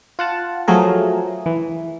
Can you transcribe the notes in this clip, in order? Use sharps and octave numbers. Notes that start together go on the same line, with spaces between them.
F4 F#5 A5
F3 F#3 A3 G#4 A#4
E3